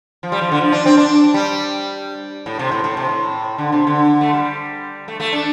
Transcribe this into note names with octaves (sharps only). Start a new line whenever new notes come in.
F3
G3
F3
D3
F3
D4
C4
D4
G3
A2
C3
A2
A2
C3
A2
D3
C3
D3
A3
G3
A3
A3
D4